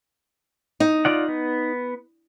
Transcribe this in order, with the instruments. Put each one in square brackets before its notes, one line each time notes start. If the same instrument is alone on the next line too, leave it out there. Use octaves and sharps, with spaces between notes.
[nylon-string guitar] D#4
[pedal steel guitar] F4 D5 F#5
B3